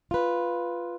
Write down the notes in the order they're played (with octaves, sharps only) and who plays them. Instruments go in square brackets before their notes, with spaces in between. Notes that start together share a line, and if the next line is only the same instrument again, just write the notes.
[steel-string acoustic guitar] F4 B4